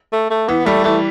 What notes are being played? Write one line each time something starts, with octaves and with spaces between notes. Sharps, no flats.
A3
A3
E3 B3
G3 A3
E3 A3